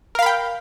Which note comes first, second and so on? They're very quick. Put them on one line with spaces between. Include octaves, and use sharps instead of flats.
A#4 F5 B5 G5